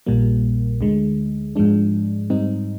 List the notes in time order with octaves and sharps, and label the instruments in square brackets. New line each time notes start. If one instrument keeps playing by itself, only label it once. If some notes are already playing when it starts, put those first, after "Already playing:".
[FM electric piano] A#1 A#2 G3 A#3
D2 D3 G#3
G#2 F3 G#3 D4
G#2 G3 C4 D#4